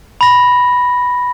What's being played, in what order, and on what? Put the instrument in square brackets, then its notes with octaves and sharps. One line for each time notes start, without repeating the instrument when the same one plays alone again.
[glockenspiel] B5 A#6